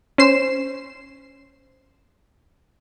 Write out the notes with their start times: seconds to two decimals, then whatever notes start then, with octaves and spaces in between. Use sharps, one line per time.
0.18 C#4 C5 C7 E7